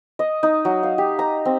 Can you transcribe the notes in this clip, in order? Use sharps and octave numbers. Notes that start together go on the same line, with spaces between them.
D#5
D#4
F#3
F5
G4
A#5
C4